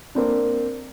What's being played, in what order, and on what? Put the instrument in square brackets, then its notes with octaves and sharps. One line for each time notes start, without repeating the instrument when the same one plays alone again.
[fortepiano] A#3 C4 D4